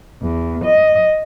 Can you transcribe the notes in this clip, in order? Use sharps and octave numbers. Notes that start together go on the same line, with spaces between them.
E2
D#5